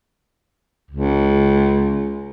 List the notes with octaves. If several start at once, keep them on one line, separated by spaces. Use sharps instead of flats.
C#2